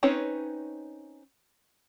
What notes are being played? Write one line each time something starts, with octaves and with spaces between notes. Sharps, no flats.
C4 C#4 D#4 B4 C#5